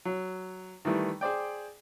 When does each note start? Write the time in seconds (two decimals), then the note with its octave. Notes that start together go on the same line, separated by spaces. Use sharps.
0.05 F#3
0.85 D#3 E3 G3 A3
1.21 G#4 C5 D5 G5